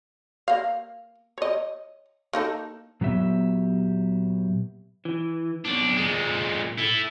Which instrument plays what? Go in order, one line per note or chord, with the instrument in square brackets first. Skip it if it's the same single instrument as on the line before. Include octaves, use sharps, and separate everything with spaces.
[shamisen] A#3 F5
C#5 D#5
A#3 D#4 A4
[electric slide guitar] A#2 F#3 B3 G4 E5
E3
[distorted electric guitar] B1 D4
A#2 G#3
E4 A4